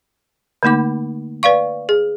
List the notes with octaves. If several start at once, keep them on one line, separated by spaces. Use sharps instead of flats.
D3 A3 A#3 D#4 D6
B4 D5 F5 C#6
G#4